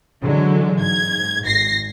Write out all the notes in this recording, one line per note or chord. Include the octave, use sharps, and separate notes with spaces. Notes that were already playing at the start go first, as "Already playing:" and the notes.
D3 E3 F#3 G#3
G#2 G#6
G#1 A#6 C7